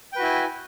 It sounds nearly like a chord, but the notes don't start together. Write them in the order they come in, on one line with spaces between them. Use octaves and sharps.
G5 B4 F#4 E4 G#5